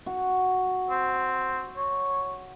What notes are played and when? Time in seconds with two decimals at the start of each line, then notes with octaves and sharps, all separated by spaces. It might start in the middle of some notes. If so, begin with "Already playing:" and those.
0.06 F#4
0.90 C4
1.77 C#5